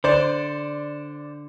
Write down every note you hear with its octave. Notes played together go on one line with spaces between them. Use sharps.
D3 C5 D5